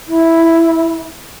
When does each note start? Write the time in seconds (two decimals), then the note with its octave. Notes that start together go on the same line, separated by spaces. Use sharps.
0.08 E4